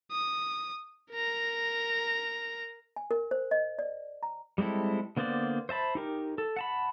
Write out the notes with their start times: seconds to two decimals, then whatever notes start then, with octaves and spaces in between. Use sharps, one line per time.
0.11 D#6
1.11 A#4 A#5
2.96 G#5
3.11 A#4
3.31 C5
3.51 D#5
3.79 D5
4.23 A#5
4.58 G3 G#3 C4 E4 A4
5.17 D3 A#3 B3 C5 D5
5.69 C5 E5 A5 B5
5.95 D#4 G4 A#4
6.38 A4
6.56 F#5 A5 B5